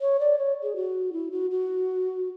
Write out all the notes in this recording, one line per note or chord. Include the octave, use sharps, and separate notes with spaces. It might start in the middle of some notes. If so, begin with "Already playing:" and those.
C#5
D5
C#5
G#4
F#4
E4
F#4
F#4